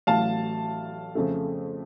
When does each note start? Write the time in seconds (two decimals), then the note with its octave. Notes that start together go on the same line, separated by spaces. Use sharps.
0.07 A1 A2 F#3 F5 A5
1.15 F2 C#3 A3